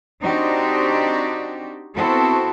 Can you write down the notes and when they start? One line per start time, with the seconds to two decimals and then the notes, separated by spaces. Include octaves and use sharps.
0.23 C4 D4 D#4 F#4 G4
1.95 B3 C4 E4 F#4 A4